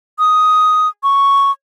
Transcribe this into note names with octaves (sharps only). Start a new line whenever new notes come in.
D#6
C#6